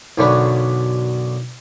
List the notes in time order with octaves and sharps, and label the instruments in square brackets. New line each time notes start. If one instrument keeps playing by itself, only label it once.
[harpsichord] B1 F#2 D3 C#4 D4 B5